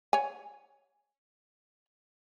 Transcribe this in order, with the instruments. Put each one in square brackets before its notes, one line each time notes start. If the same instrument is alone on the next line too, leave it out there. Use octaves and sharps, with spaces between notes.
[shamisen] C#5 G#5